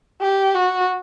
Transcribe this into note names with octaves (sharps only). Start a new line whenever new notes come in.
G4
F#4